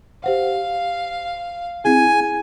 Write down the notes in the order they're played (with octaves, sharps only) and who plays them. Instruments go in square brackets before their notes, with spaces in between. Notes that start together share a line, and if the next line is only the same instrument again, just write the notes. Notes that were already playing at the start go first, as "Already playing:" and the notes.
[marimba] G4 C5 F#5 [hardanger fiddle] F5
[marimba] C4 E4 G#4 [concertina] G#5